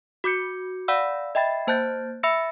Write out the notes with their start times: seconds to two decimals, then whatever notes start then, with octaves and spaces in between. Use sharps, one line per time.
0.24 F#4 D6 G6 C#7
0.88 D5 F5 F#5 B5 E6
1.35 D#5 E5 G5 B5 A6
1.67 A#3 C5 A5 F#6 G6 A6
2.23 E5 B5 E6 A#6 C#7